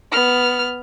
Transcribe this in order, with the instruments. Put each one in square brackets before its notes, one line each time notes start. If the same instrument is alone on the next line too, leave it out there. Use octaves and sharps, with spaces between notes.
[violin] B3 F6